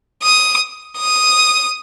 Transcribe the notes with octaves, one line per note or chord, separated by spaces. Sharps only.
D#6
D#6